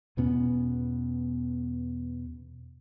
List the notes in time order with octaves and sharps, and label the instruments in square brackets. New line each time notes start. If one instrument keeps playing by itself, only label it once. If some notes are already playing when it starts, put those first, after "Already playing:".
[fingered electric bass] E2 B2 B3 C#4